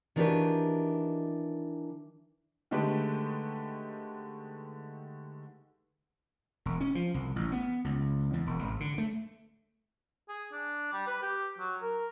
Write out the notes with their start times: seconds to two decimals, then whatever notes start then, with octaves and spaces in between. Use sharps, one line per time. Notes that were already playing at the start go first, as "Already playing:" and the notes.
0.16 D#3 E3 D4 F#4 G4 B4
2.71 D3 D#3 G#3 A3 G4 B4
6.66 E1
6.81 C#4
6.95 F3
7.14 C2
7.36 A1
7.52 B3
7.84 C#2
8.33 E2
8.47 E1
8.63 G#1
8.80 D3
8.98 A3
10.29 G#4
10.52 D4
10.93 G3
11.07 B4
11.22 G4
11.59 F#3
11.82 A#4